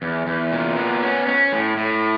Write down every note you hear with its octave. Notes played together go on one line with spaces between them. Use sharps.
E2
E2
A#2
B3
C#4
C#4
A2
A2